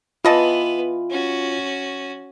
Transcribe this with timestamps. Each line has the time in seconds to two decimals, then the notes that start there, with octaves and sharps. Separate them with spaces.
0.25 E3 B3 F4 B4 D#5 A5
1.10 C#4 F#4